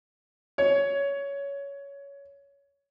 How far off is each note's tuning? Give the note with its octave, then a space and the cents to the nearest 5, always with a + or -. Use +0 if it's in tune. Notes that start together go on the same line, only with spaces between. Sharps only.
C#5 +15